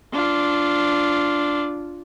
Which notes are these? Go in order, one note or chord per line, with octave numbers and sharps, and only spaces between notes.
D4 F4